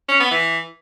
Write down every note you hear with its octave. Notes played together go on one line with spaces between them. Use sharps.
C#4
B3
E3